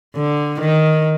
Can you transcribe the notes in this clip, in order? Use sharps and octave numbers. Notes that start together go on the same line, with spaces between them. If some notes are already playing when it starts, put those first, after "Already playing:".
D3
D#3